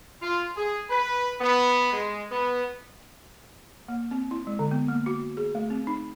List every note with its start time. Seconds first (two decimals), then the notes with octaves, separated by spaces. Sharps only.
0.21 F4
0.55 G#4
0.90 B4
1.40 B3
1.93 G#3
2.30 B3
3.88 A#3
4.11 C4
4.31 E4
4.47 G#3
4.59 D3
4.71 B3
4.88 A#3
5.06 F#4
5.37 G#4
5.55 A3
5.70 C4
5.87 D#4